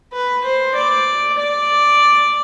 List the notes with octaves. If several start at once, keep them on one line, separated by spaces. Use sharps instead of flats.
B4
C5
D5
D5